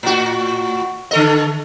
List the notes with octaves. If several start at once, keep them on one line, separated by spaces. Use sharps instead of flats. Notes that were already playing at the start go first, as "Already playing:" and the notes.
A2 F#4
D3 A4 D#5